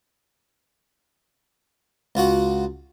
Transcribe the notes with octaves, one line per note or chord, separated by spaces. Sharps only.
C#2 F4 F#4 F#5